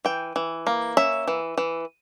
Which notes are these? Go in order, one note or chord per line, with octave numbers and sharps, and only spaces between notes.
E3 G5
E3
A#3
C#4 E5
E3
E3